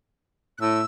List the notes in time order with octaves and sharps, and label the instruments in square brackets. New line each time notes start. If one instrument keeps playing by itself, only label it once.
[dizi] F#6
[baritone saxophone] A2 [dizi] E6